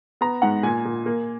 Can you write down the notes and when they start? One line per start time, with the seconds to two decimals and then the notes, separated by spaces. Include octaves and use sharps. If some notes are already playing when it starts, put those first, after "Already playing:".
0.21 B3 A#5
0.42 G#2 F#5
0.63 A#2 G#5
0.85 A#2
1.06 A#3